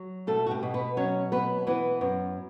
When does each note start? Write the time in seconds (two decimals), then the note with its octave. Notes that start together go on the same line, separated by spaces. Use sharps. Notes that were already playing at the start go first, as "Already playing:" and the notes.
Already playing: F#3
0.27 B2 A3 A4
0.46 F#4
0.51 G3 G4
0.63 B2
0.74 B3 B4
0.97 F#3 C#4 C#5
1.32 B2 B3 B4
1.67 E3 B3 B4
2.01 F#2